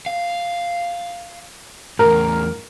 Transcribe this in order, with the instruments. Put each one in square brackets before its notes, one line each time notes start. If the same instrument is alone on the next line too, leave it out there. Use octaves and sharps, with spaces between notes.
[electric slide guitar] F5
[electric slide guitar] E2 A2 [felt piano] A#4